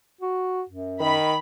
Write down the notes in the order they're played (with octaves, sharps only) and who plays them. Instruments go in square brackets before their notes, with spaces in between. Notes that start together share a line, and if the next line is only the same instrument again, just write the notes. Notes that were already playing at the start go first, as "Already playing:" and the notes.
[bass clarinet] F#4
F#2
[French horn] D#3 [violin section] B5